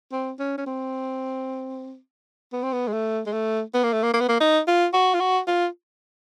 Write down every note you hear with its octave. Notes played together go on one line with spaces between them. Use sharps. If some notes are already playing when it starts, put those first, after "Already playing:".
C4
C#4
C#4
C4
B3
C4
B3
G#3
A3
G#3
A3
B3
A#3
A3
A#3
A#3
B3
A#3
D#4
F4
F#4
F4
F#4
F4